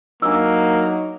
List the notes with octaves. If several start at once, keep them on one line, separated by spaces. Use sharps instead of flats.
F#3 A#3 D4 D#4 E6